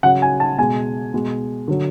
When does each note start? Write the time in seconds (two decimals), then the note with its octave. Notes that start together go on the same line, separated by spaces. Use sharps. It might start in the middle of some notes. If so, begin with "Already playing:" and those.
0.03 C#3 F#3 F#5
0.22 G#5
0.40 A5
0.58 B2 G#3 G#5
1.14 B2 G#3
1.68 D3 F#3